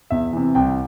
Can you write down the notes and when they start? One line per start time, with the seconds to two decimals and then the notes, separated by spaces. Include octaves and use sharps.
0.10 E2 E5
0.33 C3 E3
0.55 C2 G5